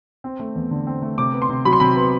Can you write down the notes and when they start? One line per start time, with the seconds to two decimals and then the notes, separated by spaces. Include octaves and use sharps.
0.24 C4
0.40 A3
0.55 E2
0.71 D3
0.87 C4
1.02 A3
1.18 C3 D6
1.34 B3
1.42 C6
1.49 C3
1.65 F#3 B5
1.73 C6
1.80 C3 B5
1.96 B3